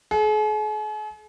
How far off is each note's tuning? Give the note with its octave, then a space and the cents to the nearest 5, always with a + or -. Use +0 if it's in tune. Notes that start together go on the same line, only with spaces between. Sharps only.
G#4 +45